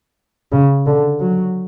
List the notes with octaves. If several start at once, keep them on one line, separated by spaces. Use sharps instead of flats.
C#3
D3
F#3